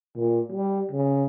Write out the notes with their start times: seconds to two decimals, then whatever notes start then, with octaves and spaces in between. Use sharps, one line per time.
0.16 A#2
0.52 G3
0.92 C#3